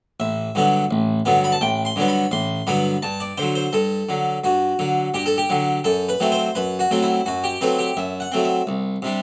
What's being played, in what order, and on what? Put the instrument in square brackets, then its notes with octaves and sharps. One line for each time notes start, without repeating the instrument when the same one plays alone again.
[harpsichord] A1 E5
G2 D3 F#3 B3
A1
G2 D3 F#3 B3
B5
A5
A1 G5
C6
G2 D3 F#3 B3
B5
A1 C6
G2 D3 F#3 B3 B5
G2 A5
D5
D3 F#3 C5
C5
G2 A4
D3 F#3
G2 F#4
D3 F#3
G2 G4
A4
G4
D3 F#3
F#2 A4
B4
F#3 A3 C4
C5
F#2 B4
F#4
F#3 A3 C4
E4
F#2 F#4
G4
F#3 A3 C4 B4
G4
F#2 E5
F#5
F#3 A3 C4
E5
C2
C3 G3 D4